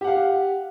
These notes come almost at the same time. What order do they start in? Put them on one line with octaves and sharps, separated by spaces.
G4 F#5 F5